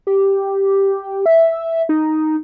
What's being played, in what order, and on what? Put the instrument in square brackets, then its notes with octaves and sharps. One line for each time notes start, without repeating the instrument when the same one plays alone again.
[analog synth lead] G4
E5
D#4